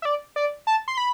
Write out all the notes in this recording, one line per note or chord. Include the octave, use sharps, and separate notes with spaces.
E5
D5
D5
A5
C6
B5